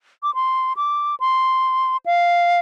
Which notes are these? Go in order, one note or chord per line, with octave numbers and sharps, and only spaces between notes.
D6
C6
D6
C6
F5